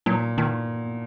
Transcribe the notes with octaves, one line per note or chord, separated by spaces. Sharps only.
A#2 F#3
A#2 D#3